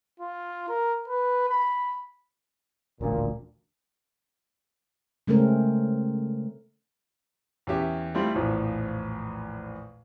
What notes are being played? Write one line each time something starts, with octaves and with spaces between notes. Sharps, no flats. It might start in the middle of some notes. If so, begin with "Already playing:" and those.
F4
A#4
B4
B5
D#1 A1 D2 A#2
C#3 G#3 A3 C4 C#4 A#4
E2 C#4 G4 E5
G3 A3 C4 E4 F4
A#1 E2 A2 F3